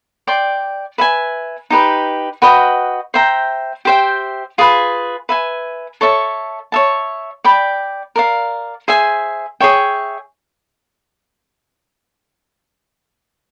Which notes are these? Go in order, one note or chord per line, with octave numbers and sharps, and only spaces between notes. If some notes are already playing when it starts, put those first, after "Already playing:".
D5 G5 C6
B4 E5 G#5
D#4 G4 B4
F#4 B4 D#5 G5
C5 E5 G5 A#5
G4 C5 E5 G5
F4 G#4 B4
B4 E5 G#5
A4 C#5 E5 A5
C#5 E5 A5
D5 G5 B5
A#4 D5 F5
G#4 C5 E5 G#5
G#4 C#5 E5 G5